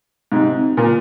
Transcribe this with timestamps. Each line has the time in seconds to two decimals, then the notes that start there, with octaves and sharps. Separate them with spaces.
0.32 G#2 C3
0.77 A#2